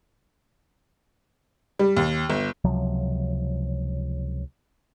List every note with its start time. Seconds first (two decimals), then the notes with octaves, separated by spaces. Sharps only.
1.79 G3
1.97 D#2
2.30 G1
2.64 C#2 C3 F3 F#3